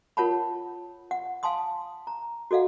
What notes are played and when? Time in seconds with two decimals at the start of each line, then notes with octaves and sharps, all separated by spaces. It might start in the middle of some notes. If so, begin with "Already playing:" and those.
0.17 F4 A#4 C#5 F#5 A5 B5
1.11 F#5
1.43 F5 G#5 A5 C6 D#6
2.07 A#5
2.51 F#4 A4 D#5 F5 F#5